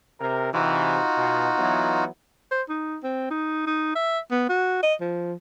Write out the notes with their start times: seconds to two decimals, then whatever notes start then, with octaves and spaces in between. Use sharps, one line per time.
0.21 C3 A#4
0.54 C3 E3 D#4 F4 F#4
1.18 B2
1.58 E3 F#3 B3
2.52 C5
2.69 D#4
3.03 C4
3.31 D#4
3.67 D#4
3.95 E5
4.31 B3
4.49 F#4
4.83 D#5
5.01 F3